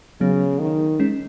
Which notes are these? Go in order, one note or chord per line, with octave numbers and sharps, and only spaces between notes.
C#3 F#3 B3
D#3
G#3 C#4